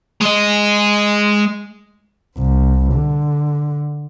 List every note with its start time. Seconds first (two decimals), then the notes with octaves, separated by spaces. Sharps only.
0.21 G#3 D#5
2.38 C2
2.93 D3